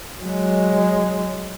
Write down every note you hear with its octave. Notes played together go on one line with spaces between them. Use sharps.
F#3 G#3